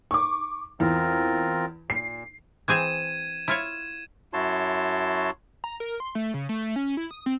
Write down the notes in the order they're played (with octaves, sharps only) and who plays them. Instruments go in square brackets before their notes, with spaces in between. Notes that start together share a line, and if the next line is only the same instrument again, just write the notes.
[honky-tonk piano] C#6 D6
[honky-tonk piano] E2 [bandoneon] C4 F4 A#4
[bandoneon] A#2 [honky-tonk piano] C7
[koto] E3 C4 G#4 [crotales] G#6 D#7 E7
[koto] E4 F4 C#5
[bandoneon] F#2 E4 F#4 C#5 A5 C6
[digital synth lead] A#5
A#4
C6
A3
C#3
A3
C#4
E4
D#6
C4